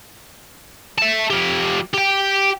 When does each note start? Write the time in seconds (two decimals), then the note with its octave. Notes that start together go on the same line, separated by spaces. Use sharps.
0.98 E5 A5
1.31 F3 G4
1.94 G4 G5